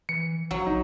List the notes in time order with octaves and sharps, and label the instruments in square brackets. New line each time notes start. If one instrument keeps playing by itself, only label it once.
[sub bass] E3 [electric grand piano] C#7
[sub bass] A#1 [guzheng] F#3
[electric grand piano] D#4